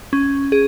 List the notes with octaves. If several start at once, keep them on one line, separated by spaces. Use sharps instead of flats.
C#4
G#4